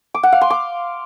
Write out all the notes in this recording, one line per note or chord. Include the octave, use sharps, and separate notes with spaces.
D6
F#5
F5
C6
D6